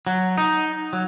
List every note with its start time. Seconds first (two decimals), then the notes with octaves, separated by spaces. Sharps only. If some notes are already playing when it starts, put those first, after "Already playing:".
0.07 F#3
0.38 D#4
0.93 F#3